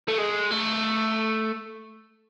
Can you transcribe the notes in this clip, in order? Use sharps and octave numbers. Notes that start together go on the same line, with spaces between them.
A3
G#3
A3